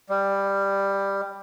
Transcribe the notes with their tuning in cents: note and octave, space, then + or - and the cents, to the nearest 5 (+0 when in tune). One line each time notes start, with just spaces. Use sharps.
G3 +10